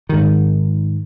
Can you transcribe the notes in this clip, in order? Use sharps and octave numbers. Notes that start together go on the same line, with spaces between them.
G#2 D#3